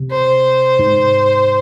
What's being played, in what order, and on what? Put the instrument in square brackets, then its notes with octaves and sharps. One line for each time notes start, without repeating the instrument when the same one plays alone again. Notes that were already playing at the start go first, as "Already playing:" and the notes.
Already playing: [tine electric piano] C3
[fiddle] C5
[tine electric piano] G#2